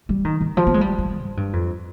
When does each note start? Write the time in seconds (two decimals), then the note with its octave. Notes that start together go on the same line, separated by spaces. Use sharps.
0.09 G3
0.25 D#3
0.41 D#3
0.57 F3
0.67 B3
0.74 G#3
0.81 G3
0.98 G3
1.05 F3
1.21 G#2
1.37 G2
1.53 F2